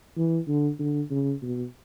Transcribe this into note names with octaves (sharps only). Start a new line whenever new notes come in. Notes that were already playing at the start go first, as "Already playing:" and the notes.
E3
D3
D3
C#3
B2